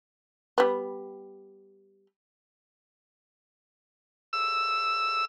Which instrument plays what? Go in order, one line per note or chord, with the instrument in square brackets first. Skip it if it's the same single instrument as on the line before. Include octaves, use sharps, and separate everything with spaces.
[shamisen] G3 B3
[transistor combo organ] E6